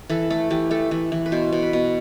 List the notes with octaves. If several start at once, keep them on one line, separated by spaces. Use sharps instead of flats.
E3 A4
A3 A4
E3 G4
A3 A4
E3
E3
B4
B2 C5
B2
B4
B2